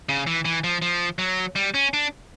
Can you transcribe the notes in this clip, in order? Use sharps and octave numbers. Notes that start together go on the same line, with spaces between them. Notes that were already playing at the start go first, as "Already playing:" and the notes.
C#3
E3
E3
F3
F3
F#3
G3
C#4
D4